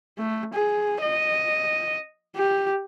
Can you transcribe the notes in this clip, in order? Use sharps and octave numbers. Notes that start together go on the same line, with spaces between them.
A3
G#4
D#5
G4